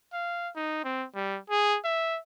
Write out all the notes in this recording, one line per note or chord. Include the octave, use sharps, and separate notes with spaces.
F5
D#4
C4
G3
G#4
E5